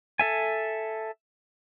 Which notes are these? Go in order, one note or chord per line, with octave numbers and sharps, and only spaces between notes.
A4 E5 G#5